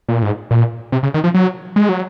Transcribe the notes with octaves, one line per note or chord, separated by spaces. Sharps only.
A#2
G#2
A#2
C3
C#3
D#3
F3
F#3
G#3
F#3